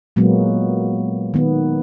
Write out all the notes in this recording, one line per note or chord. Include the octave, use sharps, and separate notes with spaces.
A#2 F#3 G#3 A#3 B3
D#3 B3